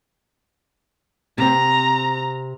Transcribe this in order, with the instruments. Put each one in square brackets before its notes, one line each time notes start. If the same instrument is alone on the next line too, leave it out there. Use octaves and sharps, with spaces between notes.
[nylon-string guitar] C3 C4 [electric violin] A#5